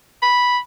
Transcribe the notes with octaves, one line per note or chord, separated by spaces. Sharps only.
B5